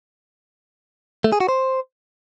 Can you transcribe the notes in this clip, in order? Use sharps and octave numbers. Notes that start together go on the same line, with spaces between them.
A3
G#4
F#4
C5